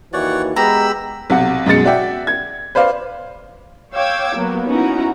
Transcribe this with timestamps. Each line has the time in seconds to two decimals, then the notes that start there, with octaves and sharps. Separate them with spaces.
0.13 D#2 E3 F#4 C#5 D5 F#5
0.56 G#3 B3 G4 A#5 B5 E6
1.30 B1 C3 F#5
1.66 F#2 B2 G#3 A6 C#7
1.85 F#4 D5 E5 G5
2.27 G#6
2.75 B4 C5 D5 F5
3.93 C#5 F5 G5 D6 E6 G#6
4.35 F#3 A#3 B3
4.66 B3 C#4 D#4 E4 F#4 A#5